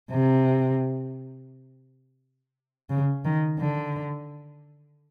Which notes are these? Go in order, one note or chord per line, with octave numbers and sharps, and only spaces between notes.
C3
C#3
D#3
D3